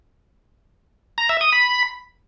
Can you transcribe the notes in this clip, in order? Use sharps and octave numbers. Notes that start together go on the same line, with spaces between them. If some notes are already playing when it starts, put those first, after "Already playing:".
A#5
E5
D#6
B5